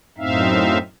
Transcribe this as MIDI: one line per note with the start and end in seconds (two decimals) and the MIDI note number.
0.18 0.78 42
0.18 0.78 45
0.18 0.78 60
0.18 0.78 63
0.18 0.78 76
0.18 0.78 77